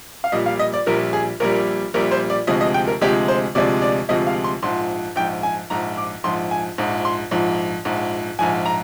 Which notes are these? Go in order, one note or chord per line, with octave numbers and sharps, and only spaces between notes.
F5
A#1 A#2 G3 D#5
F5
D#5
D5
A#1 A#2 G3 A#4
G#4
A#1 A#2 G3 A#4
A#1 A#2 G3 A#4
C5
D5
D2 C3 F3 G#3 D#5
D#5
G5
A#4
D2 C3 F3 G#3 G4
C5
D2 C3 F3 G#3 D5
D5
D2 C3 F3 G#3 D#5
F5
C6
A#1 G#2 F3 C6
A#1 G#2 F3 G5
G#5
A#1 G#2 F3 A#5
D6
A#1 G#2 F3 C6
G#5
A#1 G#2 F3
C6
A#1 G#2 F3
A#1 G#2 F3
A#1 G#2 F3 G#5
A#5